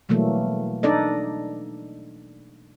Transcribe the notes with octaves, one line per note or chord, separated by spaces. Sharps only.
B2 E3 F#3 G3 A3 A#3
D4 D#4 A4 D5 D#5